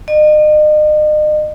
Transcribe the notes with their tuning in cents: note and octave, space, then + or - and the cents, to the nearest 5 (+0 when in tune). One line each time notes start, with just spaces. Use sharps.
D#5 -40